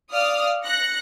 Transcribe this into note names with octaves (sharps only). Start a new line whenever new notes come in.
D5 F5 D#6 F6
F#6 A#6 C#7